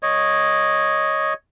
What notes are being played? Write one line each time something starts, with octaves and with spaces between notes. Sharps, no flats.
C#5 D#5